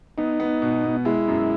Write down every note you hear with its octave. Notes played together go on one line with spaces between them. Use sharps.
B3 D#4
B3
B2
B2
G#3 E4
F#2